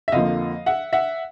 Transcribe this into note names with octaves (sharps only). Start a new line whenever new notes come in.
E5
F2 D3 F3 A#3 D#5 F5
E5 F#5
E5 F#5